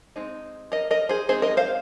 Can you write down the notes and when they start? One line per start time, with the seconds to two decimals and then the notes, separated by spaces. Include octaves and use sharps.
0.16 G#3 C4 D#4
0.72 A#4 D#5
0.91 A#4 D#5
1.09 G#4 C5
1.29 G#3 C4 D#4 G#4 C5
1.42 A#4 D#5
1.57 C5 F5